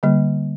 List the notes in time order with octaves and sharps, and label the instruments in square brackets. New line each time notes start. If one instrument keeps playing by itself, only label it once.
[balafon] D3 G3 A#3